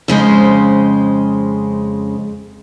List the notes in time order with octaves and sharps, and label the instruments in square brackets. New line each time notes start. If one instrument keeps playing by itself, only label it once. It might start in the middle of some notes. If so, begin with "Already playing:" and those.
[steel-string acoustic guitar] F2 C#3 G#3 C5